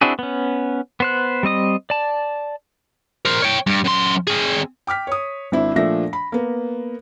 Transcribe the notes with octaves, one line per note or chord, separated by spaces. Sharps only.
C4 D4 E4 F#4 G#4
B3 C#4
B3 C5 F#6
G3 C4 D#5 D#6
D5 A5
A#4 C5
C#5 G5
G2
F#2 C6
C4 G#4
G5 D6 F6 B6
C#5 D#6
G#1 C4 D4 E4 E5
A#2 F3 A3 D4 E5 A#6
B5
A#3 B3